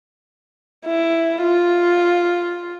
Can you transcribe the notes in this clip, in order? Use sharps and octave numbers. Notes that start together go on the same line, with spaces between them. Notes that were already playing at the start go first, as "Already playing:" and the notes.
E4
F4